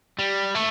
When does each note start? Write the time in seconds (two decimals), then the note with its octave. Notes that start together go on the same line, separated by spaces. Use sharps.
0.19 G3
0.55 A3